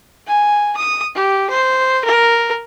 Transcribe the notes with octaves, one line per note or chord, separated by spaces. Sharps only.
G#5
D#6
G4
C5
A#4